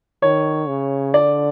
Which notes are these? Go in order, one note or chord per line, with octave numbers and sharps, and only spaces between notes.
D#3 C#5
C#3
D3 D5